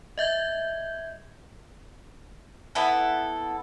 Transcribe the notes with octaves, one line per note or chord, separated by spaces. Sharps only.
D#5 E5 G6 G#6
B3 E4 A4